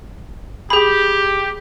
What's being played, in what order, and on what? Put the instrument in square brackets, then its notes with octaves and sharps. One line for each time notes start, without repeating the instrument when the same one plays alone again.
[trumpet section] G4 [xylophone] G#4 B5